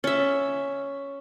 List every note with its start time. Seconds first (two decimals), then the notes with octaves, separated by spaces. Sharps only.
0.04 C#4 E5